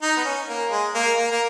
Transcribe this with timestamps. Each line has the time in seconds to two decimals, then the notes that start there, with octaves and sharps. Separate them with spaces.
0.02 D#4
0.17 B3
0.25 C#4
0.49 A#3
0.71 G#3
0.94 A#3
1.18 A#3
1.32 A#3